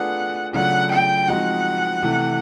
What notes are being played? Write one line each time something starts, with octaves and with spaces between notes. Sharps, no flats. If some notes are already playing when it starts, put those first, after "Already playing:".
Already playing: A3 D4 F4 G#4 B4 F#5
C#3 F#3 A3 D4 F4 F#5
G5
F3 G#3 C4 D#4 F#4 F#5
C3 E3 A3